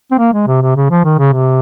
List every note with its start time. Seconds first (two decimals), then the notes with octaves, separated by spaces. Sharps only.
0.11 C4
0.19 A#3
0.33 G#3
0.47 C3
0.62 C3
0.76 C#3
0.91 F3
1.04 D#3
1.18 C#3
1.33 C3